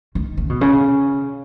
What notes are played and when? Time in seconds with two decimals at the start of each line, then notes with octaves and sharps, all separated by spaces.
0.15 D#3
0.37 C#3
0.50 B2
0.61 C#3